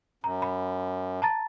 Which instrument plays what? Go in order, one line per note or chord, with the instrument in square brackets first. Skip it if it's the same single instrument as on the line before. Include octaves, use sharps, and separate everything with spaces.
[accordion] F#2 [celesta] A#5
[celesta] B5
A5 A#5 A6